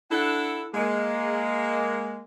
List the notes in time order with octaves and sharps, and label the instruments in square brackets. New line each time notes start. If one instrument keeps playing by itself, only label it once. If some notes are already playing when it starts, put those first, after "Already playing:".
[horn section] D4 E4 A4 F#5
G#3 A#3